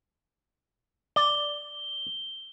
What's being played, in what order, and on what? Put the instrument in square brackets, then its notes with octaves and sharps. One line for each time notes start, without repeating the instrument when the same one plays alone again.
[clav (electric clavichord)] D5 [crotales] G7